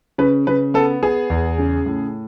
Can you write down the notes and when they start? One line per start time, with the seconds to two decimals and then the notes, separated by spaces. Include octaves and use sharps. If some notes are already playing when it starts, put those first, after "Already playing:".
0.18 C#3 B4
0.47 C#3 B4
0.74 B3 A4
1.02 B3 G#4
1.30 E2
1.58 C#3
1.86 A2